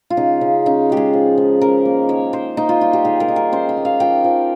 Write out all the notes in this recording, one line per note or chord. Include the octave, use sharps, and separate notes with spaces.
F4
C#3 D#4
C#3
C#4 D#4
G#3 G4
G#4
F3
F3
C#4 A#4
A#3
D#3 C#5
D#4 C5
A#3 D#4
F4
G3 F4
G4
D#3 G#4
A#4
D#3
A#4
C#4 C5
C#5
A#3
F5
F3 G5
F3